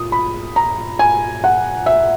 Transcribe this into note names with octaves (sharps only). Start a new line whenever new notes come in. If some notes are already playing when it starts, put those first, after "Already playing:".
Already playing: A#2 D#6
B5
A#5
G#5
F#5
E5